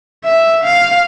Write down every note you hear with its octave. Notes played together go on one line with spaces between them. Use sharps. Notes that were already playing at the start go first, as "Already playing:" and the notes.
E5
F5